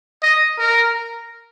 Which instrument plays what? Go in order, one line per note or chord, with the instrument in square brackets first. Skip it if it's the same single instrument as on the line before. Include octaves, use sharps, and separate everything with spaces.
[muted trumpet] D#5
A#4